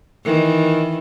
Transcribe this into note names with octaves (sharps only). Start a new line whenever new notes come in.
D#3 E3